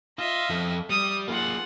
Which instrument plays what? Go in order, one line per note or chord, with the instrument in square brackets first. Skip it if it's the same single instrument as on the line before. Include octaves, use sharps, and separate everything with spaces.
[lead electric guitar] F4 [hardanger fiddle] D#5 E5
[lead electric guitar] F2
[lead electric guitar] G3 [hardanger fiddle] D#6
[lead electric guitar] A#3 G#4 [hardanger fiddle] F4 F#5